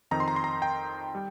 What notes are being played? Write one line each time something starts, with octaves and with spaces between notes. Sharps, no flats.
F2 D#3 C4 D#4 A#5
C6
A#5
C6
A#5
G5
G3